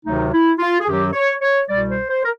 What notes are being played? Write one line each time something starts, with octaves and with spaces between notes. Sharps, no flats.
D2 C3 D#3 F#3 A3 D#4
E4
F4
G#4
F#2 D#3 F#3 G4
C#5
C#5
C2 B2 G3 D5
C5
C5
A#4